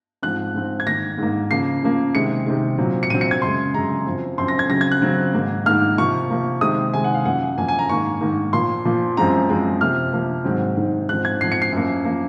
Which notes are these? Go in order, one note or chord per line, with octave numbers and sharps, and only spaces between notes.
G#2 F3 C4 F#6
G#2 F3 C4
G#6
G#2 D#3 A#3 A#6
G#2 D#3 A#3
C#3 F3 A#3 C7
C#3 F3 A#3
C3 D#3 G#3 C#7
C3 D#3 G#3
A#2 F#3 C4
C#7
A#2 F#3 C4 D#7
C#7
G#6
F#2 C#3 G#3 C6
F#2 C#3 G#3 A#5
F#2 F3 C4
F#2 F3 C4 C6
A#6
G#6
C#3 F#3 C4 A#6
G#6
F#6
C#3 F#3 C4
G#2 D#3 A#3
G#2 D#3 A#3 F6
C3 F3 A#3 C#6
C3 F3 A#3
C3 D#3 G#3 D#6
C3 D#3 G#3 G#5
F#5
F5
F#2 F3 A#3 F#5
F#2 F3 A#3 G#5
G#5
A#5
G#2 D#3 A#3 C#6
G#2 D#3 A#3
A#2 F3 A#3 C6
A#2 F3 A#3
F#2 F3 G#3 C4 A#5
F#2 F3 G#3 C4
C3 F3 A#3 F6
C3 F3 A#3
G#2 D#3 F#3 C4
G#2 D#3 F#3 C4
G#2 F3 C4 F#6
G#6
G#2 F3 C4 C7
C#7
C7
F#2 F3 A#3
F3 A#3